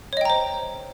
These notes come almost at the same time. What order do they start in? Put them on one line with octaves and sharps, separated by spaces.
C#5 D#5 G5 A#5 C5